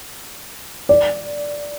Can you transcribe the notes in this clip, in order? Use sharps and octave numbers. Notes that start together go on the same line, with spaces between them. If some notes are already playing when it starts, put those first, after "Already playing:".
D5